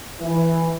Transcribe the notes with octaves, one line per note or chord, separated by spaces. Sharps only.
E3